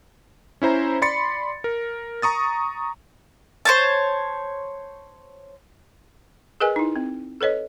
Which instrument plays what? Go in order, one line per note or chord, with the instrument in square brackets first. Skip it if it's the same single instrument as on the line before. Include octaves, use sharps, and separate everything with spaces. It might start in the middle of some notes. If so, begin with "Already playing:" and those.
[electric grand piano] C#4 E4 C5 A#5
D5 B5 C6 A6 C#7
A#4
A#5 C#6 D#6 A6
[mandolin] C5 C#5 A5
[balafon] G#4 A#4 B4 D#5 G#5
D#4 E4
C4
A4 B4 C#5 D#5